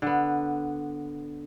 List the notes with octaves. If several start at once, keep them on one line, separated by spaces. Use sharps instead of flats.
D3 B3